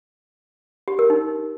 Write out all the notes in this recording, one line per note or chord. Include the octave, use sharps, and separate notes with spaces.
G4
A#4
D#4